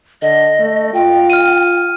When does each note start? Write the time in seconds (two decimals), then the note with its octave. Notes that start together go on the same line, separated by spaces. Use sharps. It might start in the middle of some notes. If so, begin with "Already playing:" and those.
0.22 D3 D#5
0.59 A3
0.94 F4 G5
1.30 F6 D#7